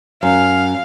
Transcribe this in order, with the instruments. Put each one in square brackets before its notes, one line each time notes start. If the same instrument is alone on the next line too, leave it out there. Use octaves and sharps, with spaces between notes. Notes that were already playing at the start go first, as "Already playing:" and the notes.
[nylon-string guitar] F#2 [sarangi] F5